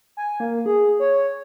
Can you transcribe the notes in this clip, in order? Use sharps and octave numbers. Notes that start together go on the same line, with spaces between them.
G#5
A#3
G#4
C#5